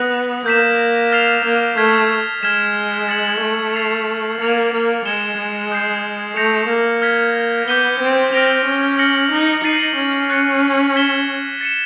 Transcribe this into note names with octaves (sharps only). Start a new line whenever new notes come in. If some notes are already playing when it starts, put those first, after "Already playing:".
Already playing: B3 D#6 F#6 A#6
A#3 G6 B6 E7
F6 A6 C7 F7
A#3
A3 F6 G#6 B6
G#3 F6 G#6 B6 E7
A6 C#7 F#7
A3
A6 C7 F7
A#3 A6 C#7 F7
A#3
G#3 G#6 C#7 E7 G7
G#3
D#6 G6 C7
A3 G6 A#6 C#7 F7
A#3
F6 G#6 B6
B3 D6 G6 B6 D#7 G7
C4
C4 F6 A#6 D7 F7
C#4
F6 A#6 C#7 F#7
D#4
D#4 A6 C7 D#7 F#7
C#4
F#6 A6 C#7
G#6 B6 E7 G7
A6 C#7 E7